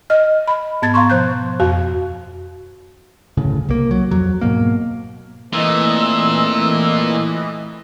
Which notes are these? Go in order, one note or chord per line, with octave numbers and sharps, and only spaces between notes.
D#5 F6
B5
G#2 B3 A5 G#6 A6
F5 A#5 C6 C#6
B2 F3 C5 F#6 G6
F2 F#4 F5
D1 G1 A2 C#3
C2 A#3
F#3
F2 F#3
G#2 B2 A#3
A#2 E3 A3 C4 D#5 E6